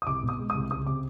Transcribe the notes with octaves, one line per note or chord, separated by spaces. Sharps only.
D#6
C2 D6
B2
D#6
G#3
C2 D#6
C#2 D#6
C3 D6